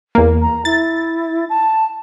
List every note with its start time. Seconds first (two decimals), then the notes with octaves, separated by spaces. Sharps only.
0.15 E2 A#3
0.42 A#5
0.65 E4 A6
1.49 A5